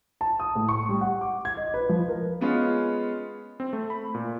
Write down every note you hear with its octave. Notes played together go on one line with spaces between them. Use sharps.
A5
D#6
A2
C#6
G3
F#5
D6
G#6
D#5
B4
F3
A#4
G#3 B3 C#4 F4
C4
A3
B5
A#2